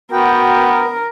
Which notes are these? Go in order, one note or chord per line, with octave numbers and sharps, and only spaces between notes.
B3 F#4 A#4 G5